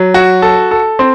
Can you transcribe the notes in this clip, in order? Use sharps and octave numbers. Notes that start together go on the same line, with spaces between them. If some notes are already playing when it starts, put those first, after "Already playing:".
Already playing: F#3
F#4
A4
A4
C4